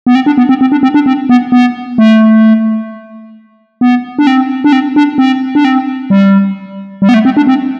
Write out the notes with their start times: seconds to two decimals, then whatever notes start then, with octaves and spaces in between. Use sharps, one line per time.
0.07 B3
0.15 C4
0.26 D4
0.38 B3
0.49 C4
0.61 C4
0.72 D4
0.83 C4
0.94 D4
1.06 C4
1.29 B3
1.52 B3
1.98 A3
3.81 B3
4.19 D4
4.27 C4
4.64 D4
4.73 C4
4.96 D4
5.18 C4
5.55 D4
5.65 C4
6.10 G3
7.02 G3
7.09 B3
7.14 A3
7.25 C4
7.37 D4
7.47 C4